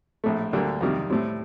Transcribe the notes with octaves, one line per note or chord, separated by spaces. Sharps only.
A#1 A2 A3
D2 D3 G3 A#3
F2 C3 D#3 G3
A2 G3 C4